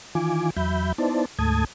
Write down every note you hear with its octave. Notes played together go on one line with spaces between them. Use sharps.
D#3 E3 F4 G#5 D6
E2 F#3 E5 B5 G6
B3 D#4 E4 C5 D5 A5
D2 G#2 A3 A5 D#6 G#6